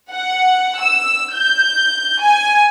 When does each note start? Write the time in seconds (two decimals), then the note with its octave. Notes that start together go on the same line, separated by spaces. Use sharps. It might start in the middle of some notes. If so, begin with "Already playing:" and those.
0.12 F#5
0.80 E6
1.35 G6
2.21 G#5